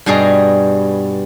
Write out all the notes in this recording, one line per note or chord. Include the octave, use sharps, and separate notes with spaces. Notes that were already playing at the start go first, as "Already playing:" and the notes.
G2 B2 G3 G#4 A#5